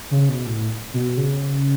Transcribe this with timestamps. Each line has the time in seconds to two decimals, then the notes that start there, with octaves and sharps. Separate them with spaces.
0.11 C#3
0.29 B2
0.46 A2
0.94 B2
1.17 C#3